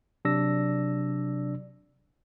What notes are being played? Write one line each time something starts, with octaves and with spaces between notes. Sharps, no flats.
C3 F#3 D4 D5 E6 A#6